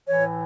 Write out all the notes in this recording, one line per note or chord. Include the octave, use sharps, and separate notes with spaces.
A2 E3 C#5